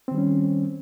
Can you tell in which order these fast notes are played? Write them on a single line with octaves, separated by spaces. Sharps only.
C4 D#3 G3 C#4